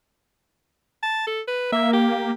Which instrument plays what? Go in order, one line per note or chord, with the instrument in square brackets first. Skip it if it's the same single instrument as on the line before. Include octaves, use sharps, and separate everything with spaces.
[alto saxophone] A5
A4
B4
[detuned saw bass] A#3 [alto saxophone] E5
[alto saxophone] G4